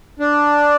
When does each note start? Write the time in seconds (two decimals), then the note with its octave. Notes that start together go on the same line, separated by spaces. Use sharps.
0.19 D4